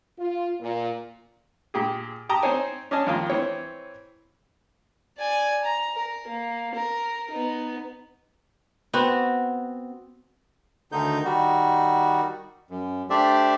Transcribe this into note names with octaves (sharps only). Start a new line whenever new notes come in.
F4
A#2
A#2 G4 G#4
G4 G5 A5 A#5 D#6
C4 D#4 C5 C#5 G#5
C#4 D4 D#5 G#5 A5
F2 D#3 A#3 F4
E3 C4 C#5
D5 G#5
A#5
A#4
A#3
A#4
B3 D#4
B3 C4 F#4
D2 D3 D#3 D#4 G6
D#3 G3 F#4
F#2
A3 D4 G4 C5 D5 E5